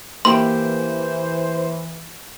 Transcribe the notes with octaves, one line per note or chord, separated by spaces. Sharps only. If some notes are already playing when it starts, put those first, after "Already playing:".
E3 A#3 E4 G4 C5 C6